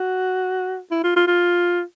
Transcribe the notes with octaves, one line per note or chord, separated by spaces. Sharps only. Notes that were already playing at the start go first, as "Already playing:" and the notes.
Already playing: F#4
E4
F4
F4
F4